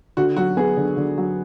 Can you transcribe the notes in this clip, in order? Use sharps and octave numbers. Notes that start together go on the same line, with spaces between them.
D3 F#4
F#3 F#4
B3 G#4
D3
D3
F#3